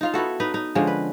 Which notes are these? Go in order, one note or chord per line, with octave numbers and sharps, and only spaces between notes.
D#4 F4 F5
B3 E4 F#4 A4
D#4 B4
D#4
D3 F3 G#3 C#4
B4